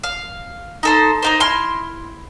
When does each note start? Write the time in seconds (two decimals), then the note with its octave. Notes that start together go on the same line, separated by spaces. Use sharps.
0.04 F5
0.83 D#4 A4 C5
1.22 A#3 D#4 C5
1.40 E4 C6 F6